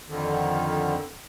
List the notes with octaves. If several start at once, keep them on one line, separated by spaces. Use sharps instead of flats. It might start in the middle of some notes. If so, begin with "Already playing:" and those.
F2 D3 D#3